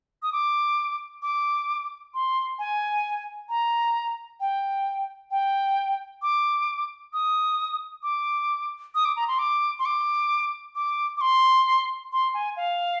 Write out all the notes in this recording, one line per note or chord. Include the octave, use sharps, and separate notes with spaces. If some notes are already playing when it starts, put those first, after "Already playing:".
D#6
D6
D6
C6
G#5
A#5
G5
G5
D6
D#6
D6
D#6
D6
A#5
C6
D6
C6
D6
D6
D6
C6
C6
G#5
F5